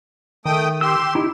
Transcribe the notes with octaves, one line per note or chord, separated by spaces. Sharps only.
D#3 A3 G5 D#6
G4 C6 E6
D#4 E4 G4